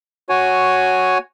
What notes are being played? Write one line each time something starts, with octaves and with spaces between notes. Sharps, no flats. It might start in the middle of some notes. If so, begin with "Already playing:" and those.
F#4 C#5 G#5